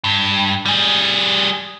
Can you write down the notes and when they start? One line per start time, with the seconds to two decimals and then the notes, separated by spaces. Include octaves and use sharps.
0.04 G2
0.65 G3 G#4